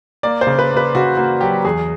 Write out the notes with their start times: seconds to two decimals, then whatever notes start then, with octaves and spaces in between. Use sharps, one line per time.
0.23 A#3 D5
0.41 C5
0.47 C#3
0.59 B4
0.71 A#3
0.77 B4
0.95 C#3 F#4
1.17 A#3 F#4
1.41 F#3 G4
1.65 E2 G#4